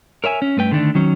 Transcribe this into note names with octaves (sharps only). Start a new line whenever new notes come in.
A#4 C#5 E5 G#5
C#4
G2 A3 B4 G5
D3 D#3 A3 B3 D4
D#3 F#3 C#4